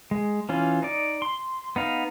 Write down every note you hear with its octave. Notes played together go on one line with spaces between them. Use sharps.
G#3
E3 C#4 F4
D#4 D5
C6
B3 D#4 F5